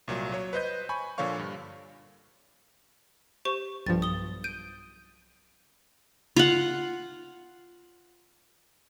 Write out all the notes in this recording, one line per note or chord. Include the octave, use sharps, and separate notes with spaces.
C2 A#2 F#3
F#3 C#5
B4 C5 D#5 G6
G#5 B5 C#6
A#2 D3 F3 C#5 F5 C#6
G2
G4 C5 C#6
B1 G2 F3 A6
D#6 G7
G6 D7 D#7
F4 F#5